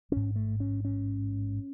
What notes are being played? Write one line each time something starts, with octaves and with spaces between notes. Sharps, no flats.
A1 G#2 C#4
A3
C#4
C#4